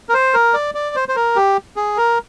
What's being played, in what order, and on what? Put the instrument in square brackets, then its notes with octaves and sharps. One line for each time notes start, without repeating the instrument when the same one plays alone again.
[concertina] A#4
C5
A#4
D5
D5
C5
C5
A#4
G4
G#4
A#4